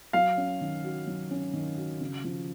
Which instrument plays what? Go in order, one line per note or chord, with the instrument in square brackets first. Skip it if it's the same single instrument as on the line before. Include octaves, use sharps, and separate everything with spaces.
[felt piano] F#3 [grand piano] F5
[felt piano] C#4
D#3
F#4
F#3
C#4
D#3
F#4
C#3
F3